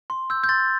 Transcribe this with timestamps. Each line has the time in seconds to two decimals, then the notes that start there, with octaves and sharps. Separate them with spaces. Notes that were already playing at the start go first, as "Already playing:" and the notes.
0.10 C6
0.30 E6 G6
0.44 G6
0.49 C6 A6